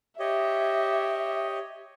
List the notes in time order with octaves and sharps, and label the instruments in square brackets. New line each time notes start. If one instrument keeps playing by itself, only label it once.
[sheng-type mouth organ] G4 C#5 D#5 [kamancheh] E5